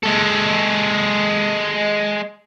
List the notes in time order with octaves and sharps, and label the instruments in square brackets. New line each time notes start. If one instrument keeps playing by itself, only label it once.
[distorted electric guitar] G#3 A4